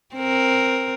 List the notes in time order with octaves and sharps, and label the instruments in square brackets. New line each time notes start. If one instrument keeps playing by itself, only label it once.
[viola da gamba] C4 A#4